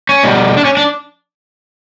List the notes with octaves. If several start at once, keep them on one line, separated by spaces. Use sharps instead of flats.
C#4
B2 G3
D4
C#4
D4